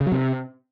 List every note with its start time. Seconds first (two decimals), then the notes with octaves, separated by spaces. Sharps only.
0.01 C#3
0.06 F#3
0.12 C3